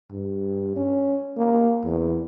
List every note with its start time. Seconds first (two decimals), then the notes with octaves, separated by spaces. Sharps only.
0.11 G2
0.76 C#4
1.37 A#3
1.84 E2